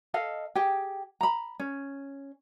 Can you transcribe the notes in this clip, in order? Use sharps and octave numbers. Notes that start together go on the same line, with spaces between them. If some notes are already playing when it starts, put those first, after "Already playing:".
A4 D#5 F5
G4 G#4 G5
A#5 B5
C#4